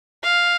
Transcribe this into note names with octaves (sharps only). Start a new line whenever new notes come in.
F5